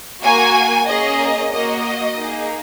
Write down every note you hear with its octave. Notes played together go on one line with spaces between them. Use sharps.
A#3 F#4 G#5
A#3 C#4 G#4 D#5
A#3 F#4 D#5
A#3 D#4 G#4